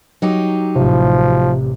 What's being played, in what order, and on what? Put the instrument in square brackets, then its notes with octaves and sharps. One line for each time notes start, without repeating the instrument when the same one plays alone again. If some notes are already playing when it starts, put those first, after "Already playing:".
[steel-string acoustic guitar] F#3 D#4 G4
[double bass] A1 [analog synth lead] C3 [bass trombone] F3